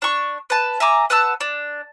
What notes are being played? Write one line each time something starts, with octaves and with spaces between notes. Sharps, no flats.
D4 C#6
B4 A5
E5 G#5 A#5 D6
B4 F#5 A5 E6
D4